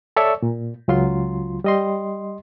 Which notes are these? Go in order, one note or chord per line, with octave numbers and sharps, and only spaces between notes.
A4 C#5 D5 E5 C#6 E6
A#2
C#2 F#3 F4 C6
G3 D#5 C6